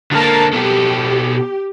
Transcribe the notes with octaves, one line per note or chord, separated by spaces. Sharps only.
D3 A#3 A#4 A5
B2 G4 A4